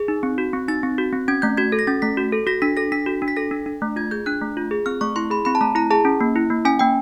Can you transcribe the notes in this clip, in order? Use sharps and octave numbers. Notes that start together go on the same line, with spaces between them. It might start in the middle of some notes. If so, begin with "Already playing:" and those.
Already playing: G#4
D#4
C4
F#4
C4
D#4 A6
C4
F#4
C4
C#4 G#6
A3 G6
F#4 G#6
A4
A#6
C#4 A6
A3 B6
F#4
A4
F#4 A#6
D4 B6
A4 A#6
D4 B6
F#4
D4
B6
A4 A#6
D4
D4
A3
F4 G#6
G#4 G6
D4 F#6
A3
F4
G#4
C4 F6
A3 C#6
E4 C6
G#4 B5
C4 B5
A5
A3 A#5
E4 A#5
G#4 A5
C#4
A#3
E4
A#3
C#4 G#5
A#3 G5